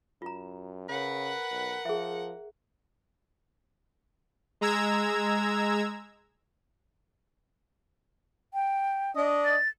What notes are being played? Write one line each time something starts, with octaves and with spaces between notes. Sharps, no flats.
F#2 F4 A#5
C#3 A#4 B4 C#5 F#5
B1
F3 G#4 E5
G#3 A#5 E6 G#6
G5
D4 D#5
A6